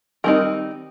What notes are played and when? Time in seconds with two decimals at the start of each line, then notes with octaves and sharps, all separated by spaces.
0.24 D#3 G3 C4 D#4 A#4